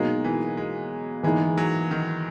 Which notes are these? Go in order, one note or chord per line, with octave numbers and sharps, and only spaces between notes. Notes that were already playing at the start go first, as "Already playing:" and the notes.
Already playing: B2 F#3 G#3 A#3 D#4
E3
G#3
E3 G#3 A#3 D#4 G#4
F#3
D#3